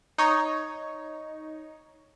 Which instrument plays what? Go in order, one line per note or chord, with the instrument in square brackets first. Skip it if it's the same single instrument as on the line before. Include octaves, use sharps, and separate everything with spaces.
[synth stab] D#4 C#5